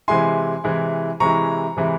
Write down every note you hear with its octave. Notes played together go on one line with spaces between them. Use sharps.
C3 E3 G#3 E4 G#5 C6
C3 E3 G#3 E4
C3 E3 G#3 E4 A#5 C#6
C3 E3 G#3 E4